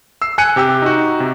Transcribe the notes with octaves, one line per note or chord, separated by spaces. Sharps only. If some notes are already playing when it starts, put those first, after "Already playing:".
E6 C7
G#5 F#6 C#7 D#7
C3 G4 G5 E6
D#4 F#4
C3